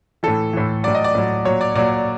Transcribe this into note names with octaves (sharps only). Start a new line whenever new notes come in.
A2 E3 A4
A2 E3
A2 F#3 D5
D#5
D5
A2 F#3
A#2 F#3 C#5
D5
A#2 F#3 D5